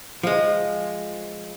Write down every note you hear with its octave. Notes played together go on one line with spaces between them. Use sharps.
F3 G#3